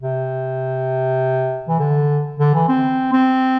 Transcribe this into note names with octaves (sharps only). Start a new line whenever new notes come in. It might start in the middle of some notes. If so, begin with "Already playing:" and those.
C3
E3
D3
D3
E3
C4
C4